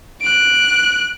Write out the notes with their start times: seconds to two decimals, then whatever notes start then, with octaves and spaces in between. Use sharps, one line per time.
0.21 F#6 D7